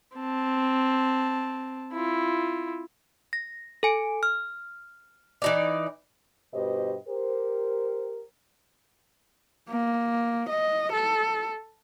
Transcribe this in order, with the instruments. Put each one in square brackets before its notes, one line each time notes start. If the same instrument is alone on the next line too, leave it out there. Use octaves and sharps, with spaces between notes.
[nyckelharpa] C4 A5
E4 F4
[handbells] A#6
A4 G#5 D7
F6
[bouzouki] E3 D#4 D5
[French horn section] G2 B2 G4 B4 C5 D#5
G4 A#4 C5
[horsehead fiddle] A#3
D#5
A4